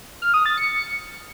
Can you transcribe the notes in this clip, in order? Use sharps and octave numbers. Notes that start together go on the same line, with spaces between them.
F6
D#6
A6
C#7